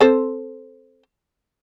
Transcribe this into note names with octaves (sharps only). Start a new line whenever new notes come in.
C4 A4 C5